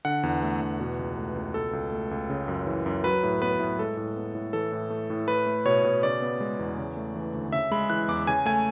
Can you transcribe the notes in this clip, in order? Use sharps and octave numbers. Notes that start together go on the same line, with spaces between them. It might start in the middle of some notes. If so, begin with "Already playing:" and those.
D3 F#5
E2
A3
E2
B2
C#2
A3
C#2
B2 A4
C#2
A3
C#2
C#3
F#2
E3
F#2
F#3 B4
A2
B3 B4
A2
G#3 A4
A2
B3
A2
E3 A4
A2
A3
A2
A3 B4
A3
B2 C#5
B2
C#3 D5
B3
G#3
E2
C#3
A3
E3
D2
C#3 E5
G#3 B5
E3 F#6
E2 D6
C#3 G#5
A3 G#5